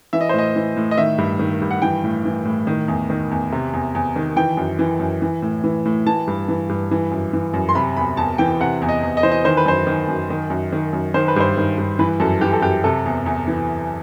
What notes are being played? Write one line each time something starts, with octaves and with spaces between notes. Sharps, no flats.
E3 E5
D#5
C5
A2 D#5
E3
A2
D#5
D#3 E5
G2
D#3
G2
F#5
E3 G5
A2
E3
A2
D#3
E2
D#3
E2
C3
E2
E2
D#3
E3 G5
F#2
E3
F#2
E3
A2
E3
A2
E3 A5
G2
E3
G2
E3
F#2
E3
F#2
C6
C3 B5
E2 B5
E2 A5
E3 G5
C3 F#5
E2
D#5
E2
D#5
E3 C5
D#5
D#3 C5
B4
F#2 C5
D#3
F#2
D#3
F#2
D#3
F#2
D#3 C5
B4
G2 C5
D#3
G2
E3 B4
F#2 A4
E3 G4
A4
F#2 G4
C3 A4
E2
E2
E3